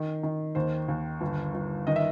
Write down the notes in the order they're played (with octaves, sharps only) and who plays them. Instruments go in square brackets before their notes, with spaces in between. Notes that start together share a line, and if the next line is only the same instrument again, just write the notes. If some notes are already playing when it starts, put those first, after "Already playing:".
Already playing: [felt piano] D#3
D#3
D#2 C5
D#2
G1
G1
D#3 D#5
E5